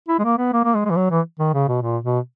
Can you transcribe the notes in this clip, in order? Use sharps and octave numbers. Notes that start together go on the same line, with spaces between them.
E4
G#3
A#3
B3
A#3
A#3
G#3
G#3
E3
F#3
E3
D#3
C#3
B2
A#2
B2